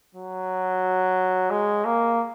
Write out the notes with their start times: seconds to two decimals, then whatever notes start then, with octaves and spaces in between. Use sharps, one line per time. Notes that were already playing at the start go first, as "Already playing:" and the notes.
0.15 F#3
1.50 G#3
1.85 A#3